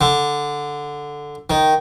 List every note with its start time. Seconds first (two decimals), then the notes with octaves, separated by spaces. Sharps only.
0.01 D3
1.50 D#3